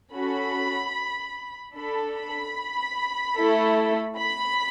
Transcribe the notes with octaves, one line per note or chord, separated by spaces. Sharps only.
C#4 F#4 A4 B5
D4 A4 B5
B5
A3 E4 A4
B5